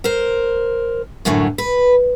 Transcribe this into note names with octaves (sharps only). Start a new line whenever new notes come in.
A#4 C5
F#2 A2 D3 F#3
B4